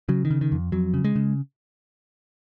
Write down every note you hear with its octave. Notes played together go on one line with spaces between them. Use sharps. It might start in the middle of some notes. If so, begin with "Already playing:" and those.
C#3 F#3
D#3
C#3
D#3
F2
F2 F#3
C#3
G#3
C#3